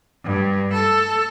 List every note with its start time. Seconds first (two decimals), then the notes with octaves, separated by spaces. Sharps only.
0.24 G2
0.73 A4